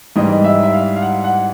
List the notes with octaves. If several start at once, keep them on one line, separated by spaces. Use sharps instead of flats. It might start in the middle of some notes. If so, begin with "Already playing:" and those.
G#2 E3 G3 D#5
E5
E5
F5
F5
F#5
F#5